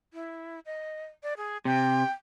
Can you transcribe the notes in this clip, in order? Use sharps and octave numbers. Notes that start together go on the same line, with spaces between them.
E4
D#5
D5
G#4
C3 G5